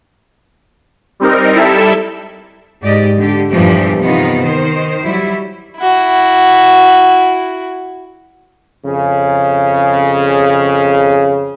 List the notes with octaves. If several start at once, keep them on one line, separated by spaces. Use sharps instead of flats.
G3 C4 D#4 A#4
G3 E4 A4 E5
G#2 G4 D5 D#5
D3 G4
E2 G2 A#2 E3 F3 G4
C3 D#3 B3 D#4 F4
D#3 C5
F#3 G3 E4
E4 F#4
F2 C#3